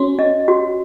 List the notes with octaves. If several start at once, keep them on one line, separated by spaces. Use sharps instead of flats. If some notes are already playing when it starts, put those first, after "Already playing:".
Already playing: C#4 F#4
C#4 D#5
F#4